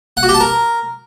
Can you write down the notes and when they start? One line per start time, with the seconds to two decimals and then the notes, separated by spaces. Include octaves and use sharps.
0.17 F#5
0.23 F#4
0.29 G4
0.34 A5
0.40 A#4